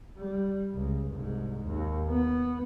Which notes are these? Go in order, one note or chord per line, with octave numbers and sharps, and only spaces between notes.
G3
C#2
C2 G#2
D#2
B3